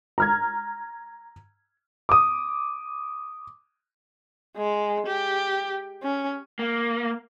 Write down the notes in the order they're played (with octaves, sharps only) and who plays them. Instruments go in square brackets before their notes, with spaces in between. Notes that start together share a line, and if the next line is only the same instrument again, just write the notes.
[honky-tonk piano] A#5 F6 G#6
[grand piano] D6 D#6
[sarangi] G#3
G4
C#4
[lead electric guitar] A#3